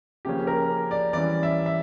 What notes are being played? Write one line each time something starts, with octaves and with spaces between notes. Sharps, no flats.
C#3 F3 A#3 C#4 G4
A#4
D5
E3 G3 C#4 D5
E5
E5